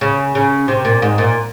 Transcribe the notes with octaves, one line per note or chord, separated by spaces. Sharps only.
C#3
C#3
C3
A#2
G#2
A#2